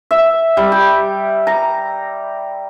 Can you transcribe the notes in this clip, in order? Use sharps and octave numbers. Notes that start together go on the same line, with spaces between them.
E5
G3
G4
A#5